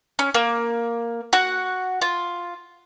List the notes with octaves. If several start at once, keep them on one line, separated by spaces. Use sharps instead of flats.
C#4
A#3
F#4 F#5
F4